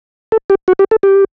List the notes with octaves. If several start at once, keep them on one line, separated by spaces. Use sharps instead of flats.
A4
G4
F#4
G4
A4
G4